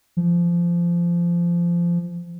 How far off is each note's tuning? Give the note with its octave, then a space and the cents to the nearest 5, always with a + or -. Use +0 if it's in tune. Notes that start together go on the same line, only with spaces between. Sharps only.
F3 -20